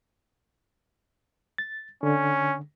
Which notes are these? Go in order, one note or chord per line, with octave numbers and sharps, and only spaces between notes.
A6
D3 C#4